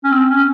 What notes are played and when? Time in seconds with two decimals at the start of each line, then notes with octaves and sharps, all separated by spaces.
0.04 C#4
0.11 C4
0.30 C#4